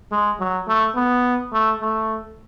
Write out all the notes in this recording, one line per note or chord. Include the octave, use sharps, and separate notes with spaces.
G#3
F#3
A3
B3
A3
A3